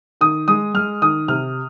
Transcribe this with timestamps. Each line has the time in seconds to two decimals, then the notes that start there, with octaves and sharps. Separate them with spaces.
0.21 D#3 D#6
0.48 G#3 D#6
0.74 G#3 F6
1.02 D#3 D#6
1.28 C3 F6